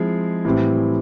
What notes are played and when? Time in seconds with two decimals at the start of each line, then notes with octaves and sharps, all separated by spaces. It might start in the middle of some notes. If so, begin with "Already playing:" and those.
Already playing: F3 G#3 C4 E4 G#4
0.45 A2 E3 G3 C4